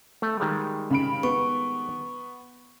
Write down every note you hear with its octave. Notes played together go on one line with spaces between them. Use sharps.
A3
D#3 G3 G#3
C#3 B5 D7
B3 C#6